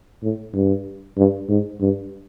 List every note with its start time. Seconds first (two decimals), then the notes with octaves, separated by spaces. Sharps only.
0.23 A2
0.54 G2
1.17 G2
1.49 G#2
1.81 G2